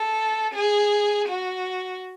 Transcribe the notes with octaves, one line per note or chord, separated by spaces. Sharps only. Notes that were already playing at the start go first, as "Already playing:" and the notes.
Already playing: A4
G#4
F#4